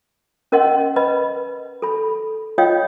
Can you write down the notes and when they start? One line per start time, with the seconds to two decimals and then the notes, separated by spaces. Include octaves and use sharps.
0.52 C#4 A#4 D#5 F#5 C6
0.96 B4 D#5 B5
1.82 A4 B5
2.58 F4 C#5 D#5 F5 G5 D#6